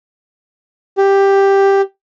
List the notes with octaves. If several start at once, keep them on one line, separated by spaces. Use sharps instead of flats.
G4